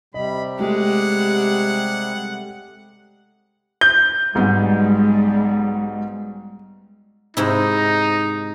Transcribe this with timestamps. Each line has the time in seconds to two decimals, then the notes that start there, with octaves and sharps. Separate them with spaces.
0.14 C3 G3 D#5 B5
0.59 G#3 A3 G4 F#5
3.81 G6
4.35 B1 G#2 G3 G#3 B3
7.37 G#2 C3 D#4 E4